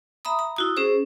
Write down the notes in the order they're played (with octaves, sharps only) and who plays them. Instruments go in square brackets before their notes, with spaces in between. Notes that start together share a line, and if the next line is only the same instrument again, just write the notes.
[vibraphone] E5 A#5 B5 D#6
A#5
E4 F#4 D#6
C#4 G#4 C5